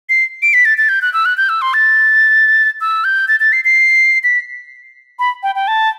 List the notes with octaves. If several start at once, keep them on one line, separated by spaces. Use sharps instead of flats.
C7
D7
B6
A6
A6
G6
F#6
E6
F#6
G6
E6
C6
A6
E6
G6
A6
A6
C7
C7
B6
B5
G5
G5
A5